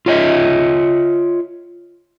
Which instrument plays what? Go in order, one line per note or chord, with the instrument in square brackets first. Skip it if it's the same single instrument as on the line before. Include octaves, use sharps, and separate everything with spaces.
[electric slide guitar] F4 C#5 D#5 E5